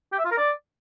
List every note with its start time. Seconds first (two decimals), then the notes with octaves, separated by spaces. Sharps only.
0.12 G4
0.19 E5
0.25 F4
0.31 A#4
0.38 D5